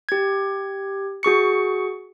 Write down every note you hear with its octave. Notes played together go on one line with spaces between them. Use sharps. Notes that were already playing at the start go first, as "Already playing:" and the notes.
G4 G#6
F#4 G#4 C#6 C#7